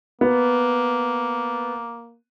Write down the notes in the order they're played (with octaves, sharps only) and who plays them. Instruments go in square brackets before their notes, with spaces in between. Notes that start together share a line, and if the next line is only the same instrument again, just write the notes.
[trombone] A#3 [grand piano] B3